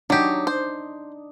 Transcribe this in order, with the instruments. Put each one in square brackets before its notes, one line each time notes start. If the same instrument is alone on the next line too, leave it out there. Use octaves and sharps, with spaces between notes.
[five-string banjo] F#3 G4 [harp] D4 D#4
[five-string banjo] C5